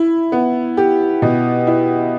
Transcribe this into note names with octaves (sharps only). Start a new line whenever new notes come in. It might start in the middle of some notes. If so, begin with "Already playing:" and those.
Already playing: E4
B3
G4
B2
E4